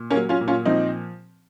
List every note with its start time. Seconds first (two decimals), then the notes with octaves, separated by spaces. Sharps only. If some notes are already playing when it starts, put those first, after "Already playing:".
Already playing: A#2
0.10 A#3 C#4
0.17 F#3
0.29 C#4 F4
0.41 A#2
0.48 C#4 F4
0.65 F3 C4 D#4